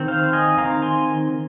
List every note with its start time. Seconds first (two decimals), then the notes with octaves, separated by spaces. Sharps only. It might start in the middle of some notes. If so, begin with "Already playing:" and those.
Already playing: D#3 C4
0.08 C5 F5
0.33 D#5 G#5
0.58 D#3 C4 F5 A#5
0.82 G#5 C6